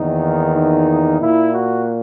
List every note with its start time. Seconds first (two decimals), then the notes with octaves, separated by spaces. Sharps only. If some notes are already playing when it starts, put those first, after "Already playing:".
Already playing: E2 D#3 A#3 D#4
0.55 D#4
1.19 A#2 A#3 E4
1.52 F#4